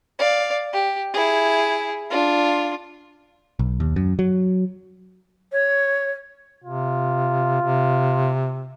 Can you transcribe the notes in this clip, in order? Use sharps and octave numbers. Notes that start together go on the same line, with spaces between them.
D5 F5
G4
E4 G#4
D4 F4
B1
D#2
F#2
F#3
C#5
C3 F4
C3